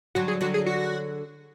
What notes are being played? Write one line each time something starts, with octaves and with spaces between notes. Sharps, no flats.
D3 F#3 F#4
G#4
D3 F#3 F#4
G#4
F#4